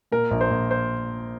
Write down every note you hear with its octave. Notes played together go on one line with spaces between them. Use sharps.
A#2 A#4
A#1
C5
A#1
C5